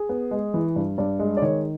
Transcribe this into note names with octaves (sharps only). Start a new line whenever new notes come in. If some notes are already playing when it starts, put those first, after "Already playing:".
Already playing: G#4
B3
G#3
E3
G2
G2 D5
G#3
D5
D#3 C#5